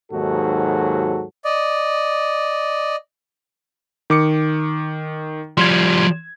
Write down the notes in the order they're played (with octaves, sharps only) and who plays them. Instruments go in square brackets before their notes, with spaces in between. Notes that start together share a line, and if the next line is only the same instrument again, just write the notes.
[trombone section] D#2 G#2 F#3 F#4 A4
[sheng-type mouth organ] D5 D#5
[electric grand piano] D#3 D6 C#7
[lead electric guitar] F3 G3 [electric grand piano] C6 G#6